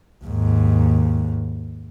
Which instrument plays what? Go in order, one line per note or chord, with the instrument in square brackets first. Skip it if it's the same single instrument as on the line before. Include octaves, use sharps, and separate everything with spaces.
[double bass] D#2 G#2